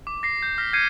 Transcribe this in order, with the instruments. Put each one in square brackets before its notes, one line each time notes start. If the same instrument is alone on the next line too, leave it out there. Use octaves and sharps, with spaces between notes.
[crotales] D6
A#6 C7
G6
F6 A#6 B6
F6 G6 G#6 C7 C#7 D#7